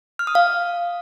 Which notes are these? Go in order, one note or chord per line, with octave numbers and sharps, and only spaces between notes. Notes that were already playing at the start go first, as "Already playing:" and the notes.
F6
D#6
F5